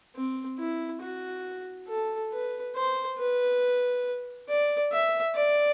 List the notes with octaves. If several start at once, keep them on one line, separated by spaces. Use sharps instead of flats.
C4
E4
F#4
A4
B4
C5
B4
D5
E5
D5